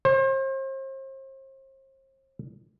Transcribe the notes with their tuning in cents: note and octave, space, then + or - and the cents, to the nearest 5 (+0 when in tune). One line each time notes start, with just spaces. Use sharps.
C5 +40